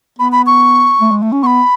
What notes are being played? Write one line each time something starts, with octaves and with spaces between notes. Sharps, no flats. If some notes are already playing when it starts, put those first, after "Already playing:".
B3 B5
B5
C#6
A3
G#3
A3
C#4
B3 B5 C#6